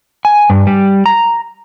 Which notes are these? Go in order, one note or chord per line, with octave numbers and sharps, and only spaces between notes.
G#5
G2
G3
A#5